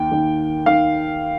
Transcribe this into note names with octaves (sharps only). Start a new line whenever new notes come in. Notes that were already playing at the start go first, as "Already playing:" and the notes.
Already playing: D#2 D#3 G5
D#2 D#3
D#3 F5